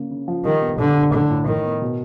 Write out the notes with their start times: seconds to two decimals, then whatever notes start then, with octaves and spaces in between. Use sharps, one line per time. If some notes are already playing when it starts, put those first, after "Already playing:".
Already playing: C#3 A#3
0.10 C#3
0.28 F3
0.44 D#3 G3
0.62 B3
0.78 D3 B3
0.96 D4
1.13 A2 D3
1.30 A2
1.47 A2 D#3
1.64 B3
1.82 B2